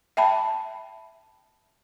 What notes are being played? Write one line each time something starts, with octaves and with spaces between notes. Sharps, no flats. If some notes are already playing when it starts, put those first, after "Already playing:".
E5 G5 A5 B5